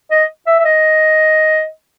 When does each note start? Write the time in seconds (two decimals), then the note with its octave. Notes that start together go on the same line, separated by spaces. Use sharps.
0.11 D#5
0.47 E5
0.59 E5
0.65 D#5